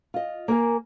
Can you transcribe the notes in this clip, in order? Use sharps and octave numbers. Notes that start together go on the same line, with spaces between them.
F4 D#5
A#3 A#4 G#5